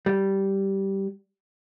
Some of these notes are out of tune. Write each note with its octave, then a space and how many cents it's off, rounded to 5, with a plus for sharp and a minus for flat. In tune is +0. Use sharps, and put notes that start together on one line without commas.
G3 -10